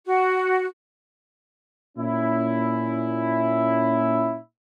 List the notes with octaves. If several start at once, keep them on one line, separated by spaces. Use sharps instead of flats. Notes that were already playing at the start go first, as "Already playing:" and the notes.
F#4
A#2 C#4 E4